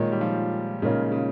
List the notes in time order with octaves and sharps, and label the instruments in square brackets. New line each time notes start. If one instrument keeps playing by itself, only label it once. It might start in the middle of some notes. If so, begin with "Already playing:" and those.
Already playing: [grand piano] A#2 G#3 D#4 A#4 C#5 [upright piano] D#3
[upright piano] G3
F3
[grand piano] A#2 G#3 D#4 A#4 C#5 [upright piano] C#3
[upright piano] C#3